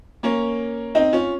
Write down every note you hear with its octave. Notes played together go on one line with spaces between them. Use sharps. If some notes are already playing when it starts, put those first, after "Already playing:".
A#3 C#4
C4 D#4
C#4 F4